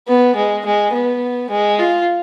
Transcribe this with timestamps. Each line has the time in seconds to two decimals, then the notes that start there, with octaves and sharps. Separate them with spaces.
0.08 B3
0.36 G#3
0.66 G#3
0.93 B3
1.50 G#3
1.79 F4